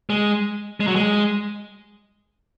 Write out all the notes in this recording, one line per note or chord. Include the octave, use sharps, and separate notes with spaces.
G#3
G#3
F#3
G#3